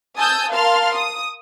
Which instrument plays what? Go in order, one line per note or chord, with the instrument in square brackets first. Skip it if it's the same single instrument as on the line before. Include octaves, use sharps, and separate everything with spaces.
[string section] G#5 A5 D#6 E6 G6
A#4 F5 A5 C6 F6
D#6